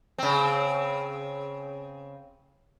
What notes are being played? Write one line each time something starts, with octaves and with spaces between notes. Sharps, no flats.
C#3 C4